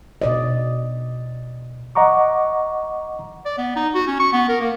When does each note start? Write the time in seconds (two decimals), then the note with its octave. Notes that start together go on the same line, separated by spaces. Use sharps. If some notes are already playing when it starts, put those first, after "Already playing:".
0.22 B2 D5 D#5
1.95 D#5 F#5 A#5 C#6 D6
3.45 D5
3.58 B3
3.76 D#4
3.94 F#4
4.07 C#4
4.20 C#6
4.33 B3
4.49 A#4
4.61 A#3